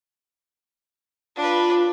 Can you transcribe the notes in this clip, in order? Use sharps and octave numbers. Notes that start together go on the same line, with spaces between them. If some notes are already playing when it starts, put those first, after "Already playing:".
D4 F4 B4